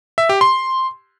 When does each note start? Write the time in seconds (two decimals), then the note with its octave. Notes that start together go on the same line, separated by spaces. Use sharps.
0.18 E5
0.29 G4
0.41 C6